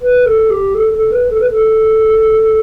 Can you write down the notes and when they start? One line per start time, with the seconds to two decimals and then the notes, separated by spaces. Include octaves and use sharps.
0.02 B4
0.26 A4
0.50 G4
0.75 A4
0.93 A4
1.12 B4
1.30 A4
1.40 B4
1.51 A4